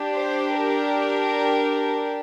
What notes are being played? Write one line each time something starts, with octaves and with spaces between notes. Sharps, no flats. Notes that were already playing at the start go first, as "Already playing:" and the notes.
Already playing: D4 G4
C5
A#4